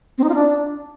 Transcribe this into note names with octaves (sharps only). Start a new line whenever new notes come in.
C4
D#4
F4
D4